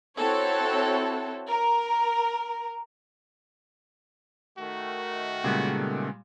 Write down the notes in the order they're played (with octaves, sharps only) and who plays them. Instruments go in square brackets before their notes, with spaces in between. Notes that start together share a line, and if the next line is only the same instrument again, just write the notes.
[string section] C4 E4 F#4 A4 C#5
A#4
[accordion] D#3 A3 [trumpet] F#4
[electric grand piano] A#2 G3 G#3 [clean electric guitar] C#3 B3